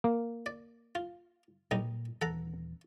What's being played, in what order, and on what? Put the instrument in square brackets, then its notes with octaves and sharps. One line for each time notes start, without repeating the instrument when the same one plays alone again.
[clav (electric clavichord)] A#3
[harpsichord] D5
F4
[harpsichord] B1 G3 D#4 [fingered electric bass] A#2
[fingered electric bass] D#1 E3 [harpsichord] A4 F#5 A#5